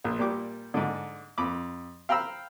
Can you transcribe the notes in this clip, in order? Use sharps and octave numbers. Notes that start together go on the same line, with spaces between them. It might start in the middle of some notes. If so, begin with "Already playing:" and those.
A#1
A#2 G3 G4 D6
G#2 D3
F2 B5 D6
F5 G5 A#5 B5 E6